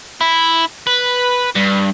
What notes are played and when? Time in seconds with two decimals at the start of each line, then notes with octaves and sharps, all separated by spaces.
0.21 E4
0.87 B4
1.55 G2